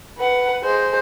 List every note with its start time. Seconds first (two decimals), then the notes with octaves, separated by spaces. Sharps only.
0.18 B4 F#5
0.64 G#3 C5